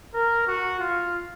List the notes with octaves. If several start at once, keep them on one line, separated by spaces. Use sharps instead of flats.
A#4
F#4
F4